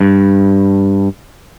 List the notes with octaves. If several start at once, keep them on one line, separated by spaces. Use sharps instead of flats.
G2